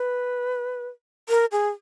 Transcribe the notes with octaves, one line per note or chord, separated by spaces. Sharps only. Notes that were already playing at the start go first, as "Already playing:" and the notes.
Already playing: B4
A#4
G#4